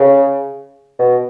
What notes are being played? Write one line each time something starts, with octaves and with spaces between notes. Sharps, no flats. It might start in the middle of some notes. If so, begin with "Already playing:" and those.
Already playing: C#3
B2